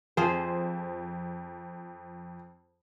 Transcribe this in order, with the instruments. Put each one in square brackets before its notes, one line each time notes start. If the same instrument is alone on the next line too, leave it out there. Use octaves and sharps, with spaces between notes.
[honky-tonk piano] F2 [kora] F3 G#4 C5